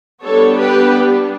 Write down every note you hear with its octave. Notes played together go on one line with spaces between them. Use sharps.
G3 B3 D4 A4 C#5
G4 B4